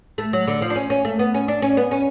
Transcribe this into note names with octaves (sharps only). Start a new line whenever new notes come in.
A3
F#3
D3
F3
D4
C#4
C#4
A3
B3
C#4
D4
C#4
B3
C#4